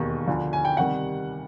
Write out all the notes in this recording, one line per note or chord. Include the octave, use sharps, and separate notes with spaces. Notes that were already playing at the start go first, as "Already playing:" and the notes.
Already playing: E1 D#2 D#3
D2 D3 F3
G#5
G5
C3 D#3 G3 F#5